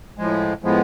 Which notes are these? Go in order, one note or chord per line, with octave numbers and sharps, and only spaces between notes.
A2 F3 G#3
A2 F3 G#3 B3